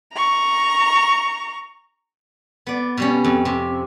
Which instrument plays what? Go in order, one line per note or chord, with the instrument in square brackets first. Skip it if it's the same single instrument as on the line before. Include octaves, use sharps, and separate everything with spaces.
[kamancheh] A#5 C#6
[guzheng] B3 D5
B2 G3 C#4
F2
C3